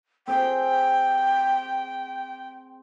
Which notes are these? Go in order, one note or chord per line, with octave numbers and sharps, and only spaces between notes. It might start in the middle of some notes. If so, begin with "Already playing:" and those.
C4 G#4 G5